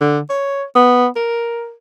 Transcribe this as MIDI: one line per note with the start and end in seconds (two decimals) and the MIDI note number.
0.01 0.19 50
0.30 0.64 73
0.76 1.08 59
1.16 1.73 70